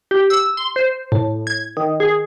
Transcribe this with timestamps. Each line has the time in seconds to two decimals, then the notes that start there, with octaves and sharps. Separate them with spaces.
0.11 G4
0.30 E6
0.57 C6
0.76 C5
1.12 A2
1.47 G#6
1.77 D#3
2.00 G#4